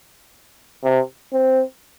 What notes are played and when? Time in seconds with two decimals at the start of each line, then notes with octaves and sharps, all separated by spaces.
0.84 C3
1.33 C4